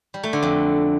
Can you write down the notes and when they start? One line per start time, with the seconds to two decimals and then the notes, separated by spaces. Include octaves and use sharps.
0.14 G3
0.23 A3
0.33 D3
0.42 F2